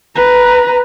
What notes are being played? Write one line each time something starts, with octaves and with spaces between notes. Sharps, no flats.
B4 A#5